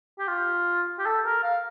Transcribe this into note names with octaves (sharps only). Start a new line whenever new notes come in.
G4
F4
G4
A4
A#4
F5